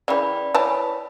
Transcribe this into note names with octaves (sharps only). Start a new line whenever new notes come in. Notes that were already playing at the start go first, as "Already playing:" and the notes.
C#3 E3 D5 G5 B5
E3 C#5 A5 B5